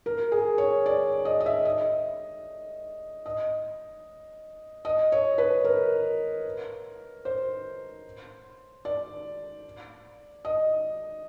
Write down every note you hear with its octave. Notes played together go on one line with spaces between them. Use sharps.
A#4
G#4
C#5
D5
D#5
D#5
E5
D#5
D#5
D#5
C#5
B4
A#4
C5
D5
D#5